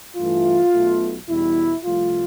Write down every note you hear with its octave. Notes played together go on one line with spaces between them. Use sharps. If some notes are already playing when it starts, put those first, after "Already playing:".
G2 E3 A3 F4
B1 B2 A3
E2 B2 G3 E4
C2 C3 F3 A3 F4